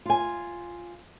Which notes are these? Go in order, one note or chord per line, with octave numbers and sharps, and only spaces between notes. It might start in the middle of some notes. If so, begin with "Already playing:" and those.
F4 G#5